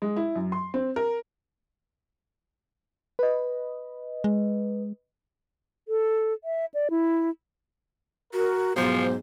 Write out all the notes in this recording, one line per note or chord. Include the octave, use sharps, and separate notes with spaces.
G#3
E4
F#2
C6
C4
A#4
B4 D#5
G#3
A4
E5
D5
E4
F#4 A#4
B1 G#2 F3 C5